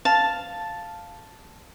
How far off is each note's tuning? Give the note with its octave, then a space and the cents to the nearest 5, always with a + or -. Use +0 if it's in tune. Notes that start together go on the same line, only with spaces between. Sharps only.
F5 +0 A5 +0